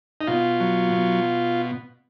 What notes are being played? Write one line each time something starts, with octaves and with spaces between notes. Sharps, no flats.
D#4
B2 F4
F#3
B2